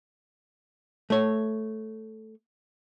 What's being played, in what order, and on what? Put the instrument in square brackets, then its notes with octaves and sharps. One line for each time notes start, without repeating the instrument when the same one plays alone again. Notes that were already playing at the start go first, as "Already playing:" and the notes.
[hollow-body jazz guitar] A3 C#5